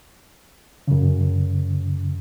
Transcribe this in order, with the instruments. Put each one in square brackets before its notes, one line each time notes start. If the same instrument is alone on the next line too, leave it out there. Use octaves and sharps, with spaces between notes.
[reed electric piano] F#2 C#3